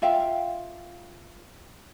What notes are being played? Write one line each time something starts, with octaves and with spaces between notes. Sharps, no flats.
F4 E5 F5 G5